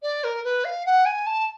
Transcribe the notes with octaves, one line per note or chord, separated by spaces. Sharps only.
D5
A#4
B4
F5
F#5
G#5
A5